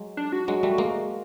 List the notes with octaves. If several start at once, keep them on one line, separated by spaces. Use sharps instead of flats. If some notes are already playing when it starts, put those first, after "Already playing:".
Already playing: F#3 G#3
D4
F#4
F#3 G#3
G3 A3
G#3 A#3